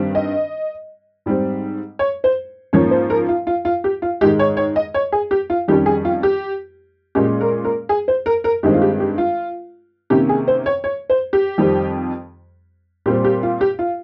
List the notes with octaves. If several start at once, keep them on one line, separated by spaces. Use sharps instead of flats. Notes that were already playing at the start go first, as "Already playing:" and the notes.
Already playing: G2 D#3 G3 C4
D#5
G#2 G3 C4
C#5
C5
G#2 F3 A#3 C#4 C#5
C5
A#4
F4
F4
F4
G4
F4
G#2 D#3 G#3 G4
C#5
C#5
D#5
C#5
G#4
G4
F4
F2 D#3 G3 C#4 G4
G#4
F4
G4
A#2 G#3 C#4 G4
A#4
A#4
G#4
C5
A#4
A#4
G2 D#3 G#3 C4 G4
F4
G4
G4
F4
C3 D#3 A#3 C#4 G4
G#4
C5
C#5
C#5
C5
G4
F2 D#3 G3 C4
A#2 G3 C4 G4
G4
F4
G4
F4